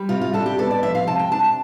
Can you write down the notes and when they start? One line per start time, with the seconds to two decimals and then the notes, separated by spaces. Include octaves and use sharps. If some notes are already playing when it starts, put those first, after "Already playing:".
Already playing: G3
0.09 C3 F4
0.21 F4
0.33 D4 A4
0.46 G4
0.58 B3 A4
0.71 D5
0.83 F3 E5
0.95 F5
1.07 C3 A5
1.19 G5
1.31 D4 A5
1.44 A5